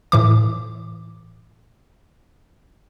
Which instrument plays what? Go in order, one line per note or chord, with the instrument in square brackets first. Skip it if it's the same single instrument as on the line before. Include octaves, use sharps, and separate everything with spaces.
[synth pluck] A2 E3 D6